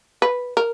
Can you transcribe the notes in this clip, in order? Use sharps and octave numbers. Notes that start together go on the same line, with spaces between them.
B4
A#4